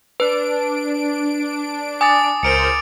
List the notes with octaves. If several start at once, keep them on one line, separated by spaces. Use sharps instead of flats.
D4 B4 D7
G#5 D6 D#6 A6
C#2 A#4 C5 C#7 D7 F7